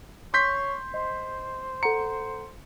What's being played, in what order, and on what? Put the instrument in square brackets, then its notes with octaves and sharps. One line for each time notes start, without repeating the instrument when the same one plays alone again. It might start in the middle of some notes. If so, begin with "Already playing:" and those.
[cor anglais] C#5 [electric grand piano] C6 G6 B6
[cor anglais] C5 [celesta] D#5
[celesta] A4 F#5 A#5 [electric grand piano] C#7